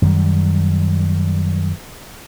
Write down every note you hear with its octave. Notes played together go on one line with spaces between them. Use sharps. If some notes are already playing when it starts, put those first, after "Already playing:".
F#2 D#3 G3